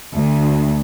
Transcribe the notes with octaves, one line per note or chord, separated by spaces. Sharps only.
D2